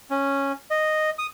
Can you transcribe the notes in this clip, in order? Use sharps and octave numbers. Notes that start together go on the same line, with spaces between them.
C#4
D#5
D#6